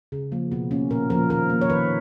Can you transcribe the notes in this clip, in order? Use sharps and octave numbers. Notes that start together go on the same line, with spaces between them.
C#3
F3 A#3
B2 B3
A#3 C#4
A#2 A#4
F3 A#3 A#4
D#3 A#4
A#3
C#5
D#3 B4